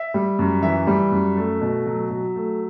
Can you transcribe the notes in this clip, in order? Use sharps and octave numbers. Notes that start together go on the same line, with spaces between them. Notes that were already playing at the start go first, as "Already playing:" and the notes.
Already playing: E5
G3
F#2
E3 E5
G3
F#2
A3
B2
F#3
F#3
A3